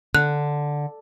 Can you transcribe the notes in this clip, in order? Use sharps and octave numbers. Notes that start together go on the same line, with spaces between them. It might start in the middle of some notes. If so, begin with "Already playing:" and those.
D3 F#6